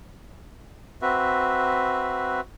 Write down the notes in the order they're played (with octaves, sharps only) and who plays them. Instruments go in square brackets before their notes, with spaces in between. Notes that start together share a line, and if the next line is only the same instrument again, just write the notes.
[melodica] C4 F#4 B4 E5